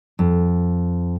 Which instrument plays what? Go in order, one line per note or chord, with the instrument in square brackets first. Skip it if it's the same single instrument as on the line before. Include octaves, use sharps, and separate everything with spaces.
[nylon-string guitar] F2